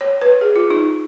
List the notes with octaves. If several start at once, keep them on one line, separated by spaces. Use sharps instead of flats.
C#5
B4
G#4
F4
D#4